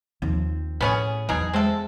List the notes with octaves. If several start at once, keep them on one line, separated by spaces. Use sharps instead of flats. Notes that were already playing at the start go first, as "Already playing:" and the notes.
D#2 F3 C4
A2 B3 C#4 G#4
E2 B2 F#3 D#4 G#4
G#3 C4 A4 E5